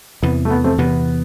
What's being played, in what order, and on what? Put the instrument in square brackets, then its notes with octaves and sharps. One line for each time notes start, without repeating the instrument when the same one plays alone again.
[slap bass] E2 C3 E3 [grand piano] B3
[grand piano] A3
B3
A3 C4
[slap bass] E2 C3 E3 [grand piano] B3